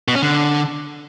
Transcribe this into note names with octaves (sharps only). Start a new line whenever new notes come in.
B2
C#4
D3